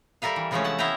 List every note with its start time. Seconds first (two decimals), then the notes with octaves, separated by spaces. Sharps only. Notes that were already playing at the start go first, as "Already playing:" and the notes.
0.22 G3 A4 A#4 E5 F5
0.36 E3
0.51 C3 E3 F3 G#3 A3 C#4
0.64 F#5 A5
0.79 B3 E4 E5 F5 G5 A#5